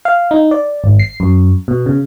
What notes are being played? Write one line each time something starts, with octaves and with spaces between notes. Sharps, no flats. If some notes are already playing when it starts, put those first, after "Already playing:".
F5
D#4
D5
G#1
C7
F#2
B2
C#3